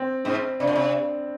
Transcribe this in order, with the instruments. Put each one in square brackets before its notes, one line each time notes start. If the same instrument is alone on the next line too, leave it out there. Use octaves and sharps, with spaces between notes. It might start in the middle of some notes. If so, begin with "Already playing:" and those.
Already playing: [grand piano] C4
[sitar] G#2 [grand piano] C4
[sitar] C3 [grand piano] D4
[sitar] A#2
C3